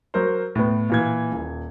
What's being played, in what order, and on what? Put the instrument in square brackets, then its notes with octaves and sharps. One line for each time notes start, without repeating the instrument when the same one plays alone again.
[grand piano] F#3 A#4 C5
A2 B3
A#2 E3 G#6
D#1